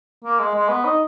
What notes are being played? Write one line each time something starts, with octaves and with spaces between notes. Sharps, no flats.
A#3
G#3
G#3
B3
D#4